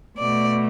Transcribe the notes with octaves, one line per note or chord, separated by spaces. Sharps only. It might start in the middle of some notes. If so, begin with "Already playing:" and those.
B2 A3 D5